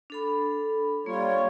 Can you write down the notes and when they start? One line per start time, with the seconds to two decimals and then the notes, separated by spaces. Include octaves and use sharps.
0.10 D4 A4 B5
1.06 G3 A#3 F4 C#5